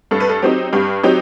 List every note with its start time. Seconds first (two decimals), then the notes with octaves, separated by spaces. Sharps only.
0.11 G2 A4
0.20 B4
0.29 A4
0.42 F#3 C4 D#4 G4
0.73 G2 G4
1.03 F#3 C4 D#4 G4